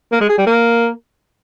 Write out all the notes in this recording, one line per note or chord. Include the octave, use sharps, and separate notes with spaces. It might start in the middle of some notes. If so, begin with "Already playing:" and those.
A#3
G#3
G#4
G3
A#3